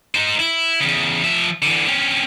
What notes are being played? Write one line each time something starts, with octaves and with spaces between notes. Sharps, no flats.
D#4 C5
E4
E2 C#3
F3 E5
D3 E3
C4 C#4